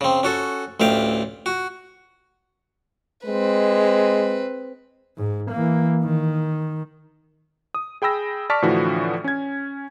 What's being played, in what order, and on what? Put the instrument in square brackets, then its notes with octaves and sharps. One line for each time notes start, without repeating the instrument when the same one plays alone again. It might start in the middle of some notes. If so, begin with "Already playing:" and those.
[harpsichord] C#3 C4
C#4 F#4 A4
A1 D2 E5 F5 G5
F#4
[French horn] G#3 [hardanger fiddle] C4 B4
[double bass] G#2
E3 A#3
D#3
[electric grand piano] D#6
G#4 G5 B5 E6 A#6
D5 A5 C#6 D6 F6 B6
A2 D3 E3 F3 D4 F#4
C#4 G#6